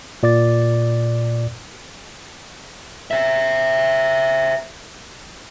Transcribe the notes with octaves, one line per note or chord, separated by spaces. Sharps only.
A#2 D5 D6 A6
C5 E5